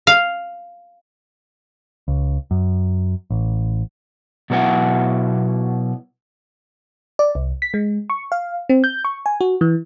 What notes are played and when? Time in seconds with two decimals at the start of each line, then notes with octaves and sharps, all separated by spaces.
0.07 F5
2.08 C#2
2.51 F#2
3.30 A1
4.50 B2 F#3 B3 E4 F#5 G5
7.19 D5
7.35 C2
7.62 B6
7.74 G#3
8.10 C#6
8.32 F5
8.69 C4
8.84 G6
9.05 C#6
9.26 G#5
9.41 F#4
9.61 E3